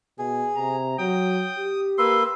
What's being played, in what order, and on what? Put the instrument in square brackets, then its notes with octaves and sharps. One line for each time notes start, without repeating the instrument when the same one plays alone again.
[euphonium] B2 [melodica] G#4
[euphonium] C3 [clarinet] A#5
[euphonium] F#3 [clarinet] G5 [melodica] D#6
[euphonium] G4
[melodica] A#3 B4 [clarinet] C6 [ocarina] E6